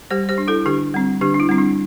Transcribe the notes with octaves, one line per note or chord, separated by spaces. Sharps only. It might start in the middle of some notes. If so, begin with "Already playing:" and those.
G3 G4 C5
G4 C5
D4
E4 A4
D3 D4 G4
G3 C4
D3 D4 G4
D4
E4
G3 C4
D4